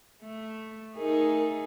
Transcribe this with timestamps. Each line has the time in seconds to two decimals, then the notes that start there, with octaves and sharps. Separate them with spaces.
0.23 A3
0.96 A3 D#4 G#4 A#4